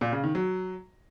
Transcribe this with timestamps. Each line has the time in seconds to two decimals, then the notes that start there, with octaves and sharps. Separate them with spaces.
0.01 A#2
0.12 C#3
0.24 D#3
0.35 F#3